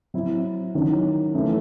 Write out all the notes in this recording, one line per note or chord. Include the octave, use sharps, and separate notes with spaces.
F#3 C4 E4
D#3 F#3 C#4 E4
E3 A3 C#4